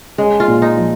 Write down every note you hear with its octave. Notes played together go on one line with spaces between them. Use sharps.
G#3 C#4
F4
A#2
D#4
F3